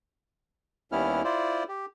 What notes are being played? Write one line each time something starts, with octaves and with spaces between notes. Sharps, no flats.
D#2 G3 B3 C#4 E4 F6
E4 F4 C5 D5
G4